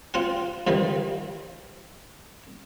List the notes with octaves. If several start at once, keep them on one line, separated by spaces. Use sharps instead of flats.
C4 F4 F#5
G2 C3 D#3 E3